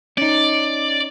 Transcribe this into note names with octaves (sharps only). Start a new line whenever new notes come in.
C#4 D#4 D5